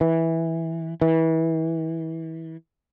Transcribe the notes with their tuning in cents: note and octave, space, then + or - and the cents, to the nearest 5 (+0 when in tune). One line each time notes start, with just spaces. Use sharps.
E3 -10
E3 -25